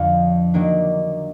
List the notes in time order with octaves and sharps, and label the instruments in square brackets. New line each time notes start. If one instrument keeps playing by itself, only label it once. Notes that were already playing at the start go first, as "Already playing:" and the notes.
Already playing: [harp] F2 D3 F3
D#3 F#3 A#3 D4